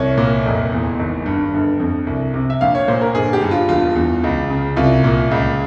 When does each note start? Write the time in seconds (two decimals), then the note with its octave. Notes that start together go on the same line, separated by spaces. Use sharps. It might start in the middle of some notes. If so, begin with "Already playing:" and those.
Already playing: C2 C#5
0.18 A#2
0.46 F1
0.72 E2
0.99 G#1
1.26 G2
1.54 G1
1.80 F2
2.07 C2
2.34 C3
2.50 E5
2.61 A#1 F5
2.75 C#5
2.88 A#2 C5
3.01 A#4
3.15 G1 G#4
3.33 G4
3.42 G2
3.51 F4
3.69 E1 F4
3.96 E2
4.24 C#2
4.50 C#3
4.76 C2 F4
5.04 A#2
5.31 C#2